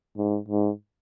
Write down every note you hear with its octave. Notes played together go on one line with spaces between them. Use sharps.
G#2
G#2